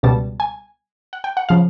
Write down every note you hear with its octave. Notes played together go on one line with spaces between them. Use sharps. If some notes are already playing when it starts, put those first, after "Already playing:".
C#2 B2 G3 A5
G#5
F#5
G5
F#5
C#3 F3 F5